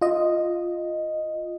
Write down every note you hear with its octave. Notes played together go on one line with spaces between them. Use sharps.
F4 D#5